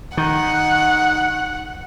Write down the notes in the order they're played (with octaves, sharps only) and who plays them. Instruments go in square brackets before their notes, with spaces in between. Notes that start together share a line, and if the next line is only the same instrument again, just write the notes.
[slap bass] D#3 [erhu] F#5